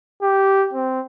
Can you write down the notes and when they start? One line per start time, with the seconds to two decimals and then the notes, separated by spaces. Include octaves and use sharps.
0.23 G4
0.74 C4